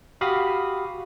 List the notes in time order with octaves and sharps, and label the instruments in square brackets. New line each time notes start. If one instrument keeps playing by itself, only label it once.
[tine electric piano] F#4 G4 F5 B5 D#6